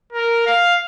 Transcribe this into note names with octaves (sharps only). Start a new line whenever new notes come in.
A#4
F5